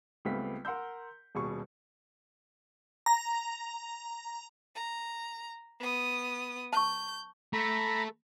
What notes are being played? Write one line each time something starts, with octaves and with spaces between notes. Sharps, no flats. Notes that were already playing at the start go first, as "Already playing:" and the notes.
C#2 G3 A3 B3 C4 B6
A#4 F#5 C6 E6 G6
D#1 B2 G#4 C#6
A#5
A#5
B3 D#6
A5 C#6 G6
A3 A#5 B5